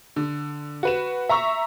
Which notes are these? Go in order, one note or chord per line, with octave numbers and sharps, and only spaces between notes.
D3
F#4 B4 E7
E5 A#5 C#6 E6